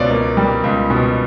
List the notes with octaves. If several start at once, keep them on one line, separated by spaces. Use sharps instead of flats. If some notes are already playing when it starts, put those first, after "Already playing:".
Already playing: C#2 B2 C#5 D5
A#3
G3
C#2
B2